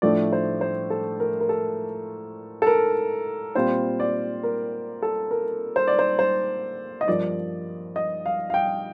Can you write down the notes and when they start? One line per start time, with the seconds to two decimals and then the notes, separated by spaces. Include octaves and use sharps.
0.02 A2 F3 A3 D4 D5
0.32 C5
0.61 C5
0.90 A4
1.20 A#4
1.41 A#4
1.49 A4
2.62 A4
2.67 A#4
3.55 A#2 G3 C4 F4 C5
4.00 D5
4.43 A#4
5.02 A4
5.31 A#4
5.76 C5
5.88 D5
5.99 C5
6.19 C5
7.01 D#5
7.07 G2 F3 A#3 D5
7.96 D#5
8.26 F5
8.50 F5
8.54 G5